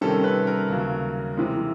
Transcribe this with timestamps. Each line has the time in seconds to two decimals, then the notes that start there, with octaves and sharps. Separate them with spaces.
0.01 C3 D#3 G3 A#3 C#4 A4
0.24 B4
0.47 A#4
0.69 D#2 C#3 F#3
1.37 C3 E3 G#3